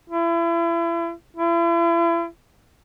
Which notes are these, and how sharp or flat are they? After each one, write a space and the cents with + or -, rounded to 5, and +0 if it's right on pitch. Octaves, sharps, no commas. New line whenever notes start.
E4 +35
E4 +40